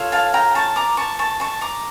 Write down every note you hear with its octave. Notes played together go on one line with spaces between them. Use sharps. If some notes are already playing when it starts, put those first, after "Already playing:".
Already playing: F4 A4 C#5
F5 A5
G5 A#5
A5 C#6
A#5 D6
A5 C#6
A5 C#6
A5 C#6
A#5 D6